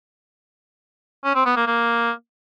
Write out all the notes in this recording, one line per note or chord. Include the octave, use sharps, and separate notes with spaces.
C#4
C4
B3
A#3
A#3